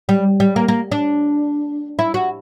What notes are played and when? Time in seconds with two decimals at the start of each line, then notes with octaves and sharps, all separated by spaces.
0.09 G3
0.40 G3
0.56 A#3
0.68 A#3
0.92 D4
1.99 E4
2.14 F#4